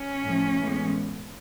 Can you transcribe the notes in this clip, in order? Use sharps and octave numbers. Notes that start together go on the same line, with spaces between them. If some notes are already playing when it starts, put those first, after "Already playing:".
Already playing: C#4
A2 F3 A3
A2 E3 G#3 B3